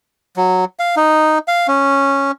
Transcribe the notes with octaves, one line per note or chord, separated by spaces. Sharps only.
F#3
F5
D#4
F5
C#4